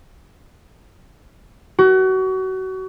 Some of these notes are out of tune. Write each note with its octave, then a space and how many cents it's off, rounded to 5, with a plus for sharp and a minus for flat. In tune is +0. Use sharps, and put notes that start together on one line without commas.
F#4 +30